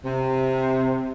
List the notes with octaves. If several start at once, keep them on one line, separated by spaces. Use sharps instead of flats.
C3